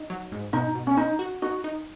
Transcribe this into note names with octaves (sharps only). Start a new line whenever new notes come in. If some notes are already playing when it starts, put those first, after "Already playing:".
Already playing: D#4
F#3
G#2
B2 D#4
B2
C#4
C#4 D#4
F#4
D#4 F#4
D#4